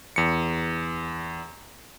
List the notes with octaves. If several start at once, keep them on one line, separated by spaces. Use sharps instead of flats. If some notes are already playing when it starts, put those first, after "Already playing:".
E2 C#7